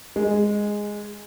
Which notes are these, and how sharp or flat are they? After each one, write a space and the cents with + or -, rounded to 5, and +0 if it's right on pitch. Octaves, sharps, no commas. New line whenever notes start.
G#3 -5